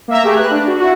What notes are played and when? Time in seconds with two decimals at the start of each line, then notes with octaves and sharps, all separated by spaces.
0.08 A#3 E5 A#5
0.23 A3 G4 G#4 G#5
0.36 B4 F#6
0.51 D4
0.67 F#4
0.80 E4 F#4